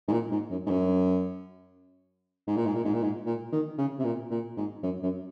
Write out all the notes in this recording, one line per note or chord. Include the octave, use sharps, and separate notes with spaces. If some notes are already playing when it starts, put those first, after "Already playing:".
G#2
A#2
G#2
F#2
G#2
F#2
G#2
A#2
G#2
A#2
G#2
A#2
G#2
A#2
D#3
C#3
C3
A#2
A#2
G#2
F#2
F#2